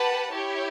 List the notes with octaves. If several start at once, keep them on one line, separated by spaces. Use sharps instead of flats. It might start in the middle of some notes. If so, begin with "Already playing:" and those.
Already playing: G4 B4 F#5 A5
E4 G4 C#5